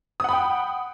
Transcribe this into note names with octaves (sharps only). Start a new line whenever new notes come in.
F#5 G5 B5 D#6